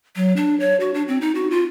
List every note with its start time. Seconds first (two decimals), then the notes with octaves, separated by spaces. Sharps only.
0.16 F#3
0.36 D4
0.60 C#5
0.80 F#4
0.94 D4
1.08 C4
1.21 D#4
1.35 F#4
1.51 F4